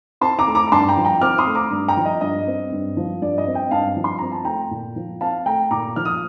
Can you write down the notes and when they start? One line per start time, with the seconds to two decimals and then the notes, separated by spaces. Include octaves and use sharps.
0.21 C4 A5 C6
0.39 A#5 D6
0.47 A3
0.55 A#5 D6
0.68 A#5
0.72 G2 A5 C6
0.89 G5 A#5
0.97 F3
1.05 G5 A#5
1.21 C4 D6 F6
1.38 C6 D#6
1.46 A3
1.55 A#5 D6
1.71 G2
1.88 G5 A#5
1.97 F3
2.05 D#5
2.21 G2 D#5
2.47 C4
2.72 G2
2.97 F3
3.22 G2 D5
3.38 D#5
3.47 C4
3.54 D#5 G5
3.71 G2 F5 A5
3.97 F3
4.04 C6
4.19 C4 A#5
4.32 A5
4.45 A3 G5 A#5
4.71 A#2
4.96 F3
5.21 C4 F5 A5
5.46 A3 G5 A#5
5.71 A#2 A#5 D6
5.96 F3 F6
6.05 D#6